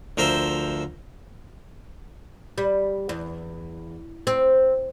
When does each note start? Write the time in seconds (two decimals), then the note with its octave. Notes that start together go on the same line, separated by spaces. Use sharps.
0.17 D2 F3 A#4 C5 E5 C6
2.58 G3
3.09 E2
4.27 C4